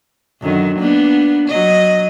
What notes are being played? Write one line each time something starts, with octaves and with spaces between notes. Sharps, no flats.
F#2 D3 D#3
A#3 B3 D4
F#3 D#5